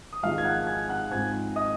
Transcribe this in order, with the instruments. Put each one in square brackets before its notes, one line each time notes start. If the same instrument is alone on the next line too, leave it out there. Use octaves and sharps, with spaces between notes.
[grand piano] D#6
G#1 G#2 F3 G#3 D#4 F5 F6
G#6
F#5 F#6
G#5 G#6
F#5 F#6
G#2 F3 C4 G#5 G#6
D#5 D#6